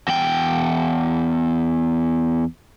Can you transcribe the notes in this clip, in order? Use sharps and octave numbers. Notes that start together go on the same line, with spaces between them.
E2 G5